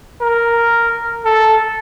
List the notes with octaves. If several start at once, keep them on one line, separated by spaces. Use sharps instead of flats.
A#4
A4